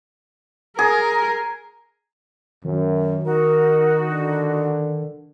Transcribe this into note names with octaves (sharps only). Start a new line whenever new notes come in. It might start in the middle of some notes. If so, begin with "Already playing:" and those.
G#4 A#4
F#2 D#3
D#4 F#4 A#4
D3